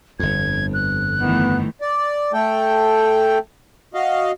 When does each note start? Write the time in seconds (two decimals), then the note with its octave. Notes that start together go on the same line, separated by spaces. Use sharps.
0.19 G1 F2 G#6
0.74 F#6
1.20 D#3 E3 A3 B3
1.81 D5
2.33 A3 A4 G5
3.94 F#4 D#5 F5